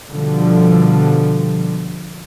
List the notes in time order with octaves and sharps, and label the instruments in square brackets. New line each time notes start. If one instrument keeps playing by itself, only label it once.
[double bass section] B2 D3 F3 G3